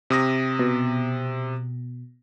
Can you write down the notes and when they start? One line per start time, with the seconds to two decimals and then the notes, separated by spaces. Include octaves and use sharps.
0.10 C3 D#6 A#6
0.59 B2